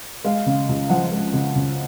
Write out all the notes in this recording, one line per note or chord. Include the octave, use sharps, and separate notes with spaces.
G#3 F5
C#3
C#2
F3 F#5
G#3
C#3
C#2